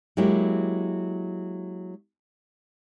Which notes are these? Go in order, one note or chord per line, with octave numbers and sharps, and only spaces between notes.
F#3 G#3 A#3 E4 G4